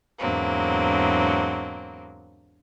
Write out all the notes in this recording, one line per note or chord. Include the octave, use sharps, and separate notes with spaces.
E2 G#2 D3 F#3 A#3 C4